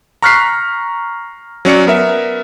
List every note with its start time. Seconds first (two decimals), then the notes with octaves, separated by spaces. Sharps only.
0.23 A#5 C#6 F6 F#6 B6 C7
1.65 F#3 C#4 D5 C#7
1.87 B3 A#4 E5